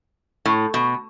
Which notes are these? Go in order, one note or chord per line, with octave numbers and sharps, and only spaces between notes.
A2
B2